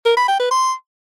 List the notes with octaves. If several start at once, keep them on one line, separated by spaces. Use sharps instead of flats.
A#4
B5
G5
B4
C6